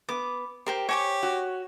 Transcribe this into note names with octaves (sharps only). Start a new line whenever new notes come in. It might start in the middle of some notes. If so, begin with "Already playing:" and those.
B3 D6
G4 A#4 C5 G5
G4 C#5 G#5 C#6
F#4